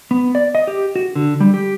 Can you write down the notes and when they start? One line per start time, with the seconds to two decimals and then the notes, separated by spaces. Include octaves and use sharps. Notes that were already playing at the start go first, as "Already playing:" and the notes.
0.11 B3
0.35 D5
0.55 D#5
0.67 G4
0.96 F#4
1.15 D3
1.40 G3
1.54 G4